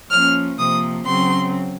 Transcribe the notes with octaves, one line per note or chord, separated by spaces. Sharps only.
F3 A#3 C#4 F6
C3 F3 A#3 D#6
C#3 F#3 C4 C6